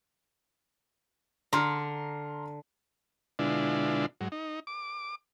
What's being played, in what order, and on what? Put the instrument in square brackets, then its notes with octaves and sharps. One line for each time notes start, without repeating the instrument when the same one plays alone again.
[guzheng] D3 [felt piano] A#5 C6 F6
[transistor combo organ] B2 D3 G#3 D4 E4 F4
G#2 F#3
D#4
D6